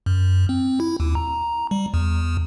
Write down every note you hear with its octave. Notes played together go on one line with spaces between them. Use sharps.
F#2
C4
E4
D#2
A#5
G3
E2